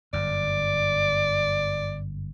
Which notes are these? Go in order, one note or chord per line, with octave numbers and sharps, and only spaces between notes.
G1 F#2 D5